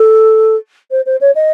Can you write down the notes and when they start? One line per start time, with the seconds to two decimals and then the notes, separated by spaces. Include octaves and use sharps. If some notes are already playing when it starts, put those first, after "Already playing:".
Already playing: A4
0.91 C5
1.06 C5
1.21 C#5
1.35 D#5